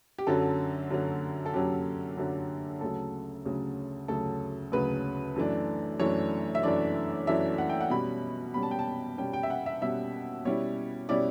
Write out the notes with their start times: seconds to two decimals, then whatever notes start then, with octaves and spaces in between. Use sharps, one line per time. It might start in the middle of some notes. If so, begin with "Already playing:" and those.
0.18 G4
0.27 F#2 D3 F#3 C#4 A4
0.90 F#2 D3 F#3 C#4
1.46 A4
1.54 F#2 D3 F#3 C#4 G4
2.18 F#2 D3 F#3 C#4
2.81 D2 C#3 F#3 A4
3.45 D2 C#3 F#3
4.08 D2 C#3 F#3 A4
4.72 D2 C#3 F#3 B4
5.36 F#2 E3 A3 D4
6.00 F#2 E3 A3 D4 C#5
6.55 E5
6.63 F#2 E3 A3 D4 D5
7.27 F#2 E3 A3 D4 E5
7.58 F#5
7.69 G5
7.81 F#5
7.90 B2 G3 C#4 B5
8.54 B2 G3 C#4 B5
8.63 A5
8.71 G5
8.79 A5
9.18 B2 G3 C#4 G5
9.33 G5
9.43 E5
9.50 F#5
9.66 E5
9.81 B2 G3 C#4 E5
10.45 B2 G3 C#4 E4 C#5
11.09 B2 G3 C#4 E4 D5